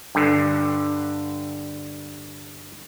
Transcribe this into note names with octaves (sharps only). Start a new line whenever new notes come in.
G2 D3